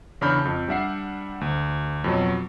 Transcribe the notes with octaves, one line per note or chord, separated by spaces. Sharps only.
E2 C#3 D4 B5 F6 G6
F2
G3 D4 E5 F#5 C7
D2
F2 B2 F#3